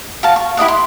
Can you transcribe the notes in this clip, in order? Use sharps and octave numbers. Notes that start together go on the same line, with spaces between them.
F#4 F5 A5
C#6
E4 G4 D#5 F#5
C6